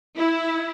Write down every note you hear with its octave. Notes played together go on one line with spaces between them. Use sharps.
E4